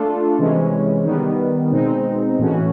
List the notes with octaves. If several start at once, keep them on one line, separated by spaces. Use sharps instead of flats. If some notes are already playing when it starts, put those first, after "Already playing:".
Already playing: A3 D4 F4 A4
C3 E3 G#3 C#4
D#3 G3 B3
B2 G#3 C4 D#4
A2 E3 A3 C#4 F#4